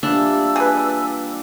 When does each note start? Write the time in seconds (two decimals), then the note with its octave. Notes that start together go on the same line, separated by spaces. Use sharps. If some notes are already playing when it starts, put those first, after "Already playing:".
0.03 A#2 E3 G3 D4 E6
0.56 G#4 B4 D5